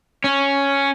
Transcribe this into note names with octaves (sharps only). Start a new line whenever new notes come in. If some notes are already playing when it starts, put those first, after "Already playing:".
C#4